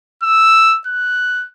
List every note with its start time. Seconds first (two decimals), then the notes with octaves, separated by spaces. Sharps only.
0.23 E6
0.87 F#6